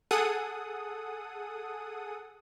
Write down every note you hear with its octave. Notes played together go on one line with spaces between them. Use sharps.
G#4 A4 F#5 D#6